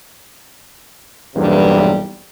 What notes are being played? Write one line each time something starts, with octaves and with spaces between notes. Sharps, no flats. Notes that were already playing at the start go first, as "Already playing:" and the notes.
B1 E2 G2 C3 G3 A#3